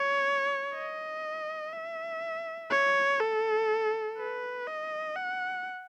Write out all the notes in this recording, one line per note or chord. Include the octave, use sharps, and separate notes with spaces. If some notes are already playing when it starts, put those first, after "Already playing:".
Already playing: C#5
D#5
E5
C#5
A4
B4
D#5
F#5